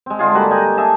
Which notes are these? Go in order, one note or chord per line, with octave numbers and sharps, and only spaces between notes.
G#3 C4
D3 G#3 F4 G#4
G3 A#3 F#4 B5
A#4 D#5 G5 G#5
G#4 E5 A5 A#5